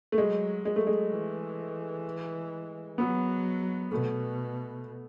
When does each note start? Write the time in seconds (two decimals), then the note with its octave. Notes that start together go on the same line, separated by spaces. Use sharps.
0.12 A3
0.18 F#3 G#3
0.65 F#3 G#3
0.76 A3
0.87 G#3
1.12 E3
2.98 F#3 B3
3.91 B2 A3